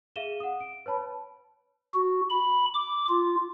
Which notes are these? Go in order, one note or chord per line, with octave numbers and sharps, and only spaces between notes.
G#4 E5 F5 D#7 E7 G7
F#5 D#6
D7
B4 C#5 A5 B5
F#4
B5
D6
F4